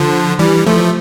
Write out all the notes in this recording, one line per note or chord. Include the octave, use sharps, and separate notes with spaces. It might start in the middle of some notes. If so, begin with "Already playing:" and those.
Already playing: D3 F3
E3 G3
F3 A3